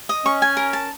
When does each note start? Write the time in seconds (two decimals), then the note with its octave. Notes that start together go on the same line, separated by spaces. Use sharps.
0.09 D#5
0.26 C#4 C#6
0.42 G#5
0.57 A#4
0.73 A5